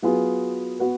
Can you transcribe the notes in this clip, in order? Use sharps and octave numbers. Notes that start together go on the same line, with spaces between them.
F#3 B3 F4 G#4
B3 F#4 B4